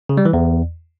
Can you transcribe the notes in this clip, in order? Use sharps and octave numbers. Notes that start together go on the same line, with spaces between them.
C#3
G3
E3
E2